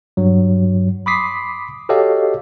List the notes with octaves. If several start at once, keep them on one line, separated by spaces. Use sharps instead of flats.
G2 F#3
B5 C6 D6 D#6 B6 C7
F#4 G4 A4 C#5 D#5 F5